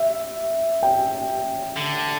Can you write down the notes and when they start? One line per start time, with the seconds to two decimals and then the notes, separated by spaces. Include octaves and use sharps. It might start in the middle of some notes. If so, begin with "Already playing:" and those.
Already playing: E5
0.83 G5
1.76 D3